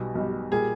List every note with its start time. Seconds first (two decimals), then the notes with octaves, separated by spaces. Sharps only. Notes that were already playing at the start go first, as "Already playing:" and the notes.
Already playing: B1 B2 G3
0.15 B1 B2 G3
0.52 A#2 G3 G#4